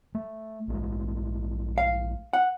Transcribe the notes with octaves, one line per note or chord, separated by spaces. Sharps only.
A3
A#1 G#3 A3
F5
F#5